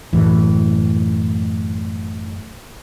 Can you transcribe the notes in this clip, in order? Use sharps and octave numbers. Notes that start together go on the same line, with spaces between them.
F#2 A2 E3